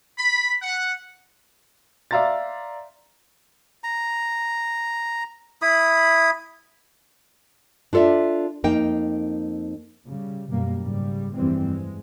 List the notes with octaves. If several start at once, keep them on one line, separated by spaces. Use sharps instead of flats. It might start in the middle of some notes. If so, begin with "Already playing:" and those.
B5
F#5
D5 E5 F5 A#5 C6 A6
A#5
E4 B5 D#6
D4 F4 A4 D5 E5
F2 A#3 D#4 G5
C#3 G3
F#2 B2 G3 A#3
G#2 C#3 G3
F1 G2 E3 G3 G#3 C4
G#3